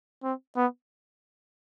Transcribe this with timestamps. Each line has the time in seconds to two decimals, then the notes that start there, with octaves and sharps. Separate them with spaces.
0.23 C4
0.56 B3